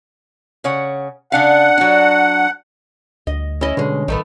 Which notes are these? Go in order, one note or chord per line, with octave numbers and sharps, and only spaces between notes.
C#3 C#5 F#5
C#3 D4 F5 F#5
F#3 D4
D2 D#5
C#4 E4 D#5
B2 D3 G#3
A#1 D#3 A3 B3